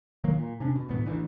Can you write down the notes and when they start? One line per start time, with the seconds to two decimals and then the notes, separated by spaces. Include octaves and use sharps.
0.24 A#1 D#3 F#3 A#3
0.38 A#2
0.60 C3 C#4 D4
0.75 B2
0.88 G#1 D2 A2 B3
1.06 A1 D2 E3